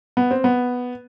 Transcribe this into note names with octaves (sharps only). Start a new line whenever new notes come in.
B3
C4
B3